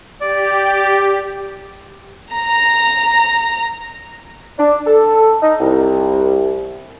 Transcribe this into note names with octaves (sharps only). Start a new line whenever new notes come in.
G4 D5
A#5
D4
A4
D#4
C2